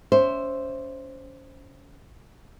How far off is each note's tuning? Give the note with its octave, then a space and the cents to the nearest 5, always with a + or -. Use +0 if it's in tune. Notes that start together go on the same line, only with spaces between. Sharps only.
C#4 +30 C5 +0 E5 +0